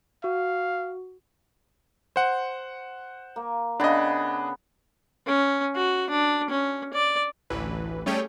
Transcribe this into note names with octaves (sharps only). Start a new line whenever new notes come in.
F#4 F5
C5 F#5
A#3
C#3 B3 D4 D#5
C#4
F#4
D4
C#4
D5
A1 D2 E3 B4
G3 A3 C#4 G#4 C#5 G5